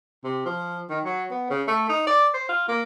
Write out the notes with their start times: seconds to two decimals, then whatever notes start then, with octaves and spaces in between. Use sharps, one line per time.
0.25 C3
0.46 F3
0.90 D#3
1.05 F#3
1.31 B3
1.50 C#3
1.68 A3
1.89 D#4
2.07 D5
2.34 C5
2.49 F4
2.69 A#3